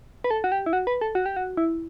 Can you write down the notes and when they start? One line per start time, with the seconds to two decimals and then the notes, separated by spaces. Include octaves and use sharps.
0.24 B4
0.31 A4
0.44 F#4
0.52 G4
0.66 E4
0.73 F#4
0.87 B4
1.01 A4
1.15 F#4
1.26 G4
1.36 F#4
1.57 E4